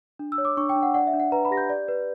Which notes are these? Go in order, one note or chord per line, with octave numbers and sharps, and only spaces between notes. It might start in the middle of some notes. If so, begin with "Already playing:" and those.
D4
E6
C#5
D6
D4 C#6
G5
D4
F#5
D5 F#5
E5
D4
F#5
B4 A#5
B5
G4 A#6
G6
D5
B4